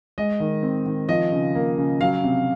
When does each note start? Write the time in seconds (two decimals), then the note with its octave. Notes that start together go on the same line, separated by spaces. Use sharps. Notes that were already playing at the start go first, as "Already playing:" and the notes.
0.18 G#3 D#5
0.40 D#3
0.63 C4
0.86 D#3
1.09 F3 D#5
1.32 C#3
1.55 A#3
1.78 C#3
2.01 F#3 F5
2.24 C3